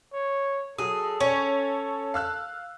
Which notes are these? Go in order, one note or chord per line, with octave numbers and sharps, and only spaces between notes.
C#5
F#3 G#4 A4 D#6
C#4 C#5
F5 E6 F#6